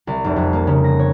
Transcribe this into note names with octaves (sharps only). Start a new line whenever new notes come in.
C2
F1
F2
A#3
C#3
A#6
C#5